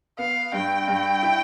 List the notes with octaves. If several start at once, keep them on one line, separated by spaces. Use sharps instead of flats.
B3 F5
G2 G5
G2
E4